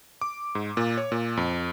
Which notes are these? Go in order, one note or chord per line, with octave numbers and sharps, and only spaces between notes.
D6
G#2
A#2
C#5
A#2
F2